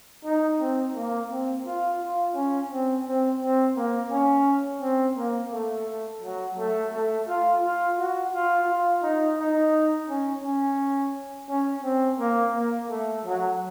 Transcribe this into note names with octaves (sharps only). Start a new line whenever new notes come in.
D#4
C4
A#3
C4
F4
F4
C#4
C4
C4
C4
A#3
C#4
C4
A#3
A3
F#3
A3
A3
F4
F4
F#4
F4
F4
D#4
D#4
C#4
C#4
C#4
C4
A#3
A#3
A3
F#3